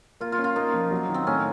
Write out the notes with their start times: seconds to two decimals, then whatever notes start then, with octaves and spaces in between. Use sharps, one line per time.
0.21 A#3 F4
0.32 F4
0.39 C#4
0.44 F4
0.56 A#3 D#4
0.74 F3
0.91 F#3
1.09 D#3
1.14 C4
1.26 A2 C#4